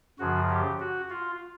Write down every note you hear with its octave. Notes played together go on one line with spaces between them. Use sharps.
F#2 C#3 F3 F#4
G4
F#4
F4